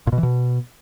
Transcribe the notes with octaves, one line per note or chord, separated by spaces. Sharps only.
A#2
B2
E3
B2